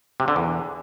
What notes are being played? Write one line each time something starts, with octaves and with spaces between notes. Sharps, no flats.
C3
D3
E2